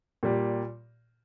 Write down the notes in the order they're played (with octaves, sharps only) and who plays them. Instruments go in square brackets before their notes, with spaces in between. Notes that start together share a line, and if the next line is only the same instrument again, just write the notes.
[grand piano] A#2 G3